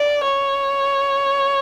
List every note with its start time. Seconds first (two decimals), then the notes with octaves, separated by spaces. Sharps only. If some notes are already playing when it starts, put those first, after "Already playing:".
Already playing: D5
0.24 C#5